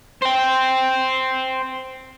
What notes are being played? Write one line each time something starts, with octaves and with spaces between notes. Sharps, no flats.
C5 G5